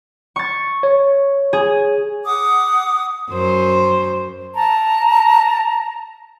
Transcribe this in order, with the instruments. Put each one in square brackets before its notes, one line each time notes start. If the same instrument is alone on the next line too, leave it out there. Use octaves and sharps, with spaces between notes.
[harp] C#6 A6
[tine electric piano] C#5
[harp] G#4
[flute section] F#5 D6 D#6
[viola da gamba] F#2 C5
[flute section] A5 A#5